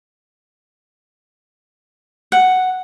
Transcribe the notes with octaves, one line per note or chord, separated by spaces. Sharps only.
F#5